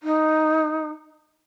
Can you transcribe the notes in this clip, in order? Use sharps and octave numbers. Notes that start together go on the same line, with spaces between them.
D#4